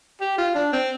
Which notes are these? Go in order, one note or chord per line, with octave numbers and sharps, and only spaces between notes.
G4
F4
D4
C4